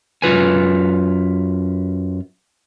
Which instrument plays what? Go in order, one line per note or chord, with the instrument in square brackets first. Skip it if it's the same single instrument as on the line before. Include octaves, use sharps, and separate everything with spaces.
[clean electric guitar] F#2 F4 B4 G#5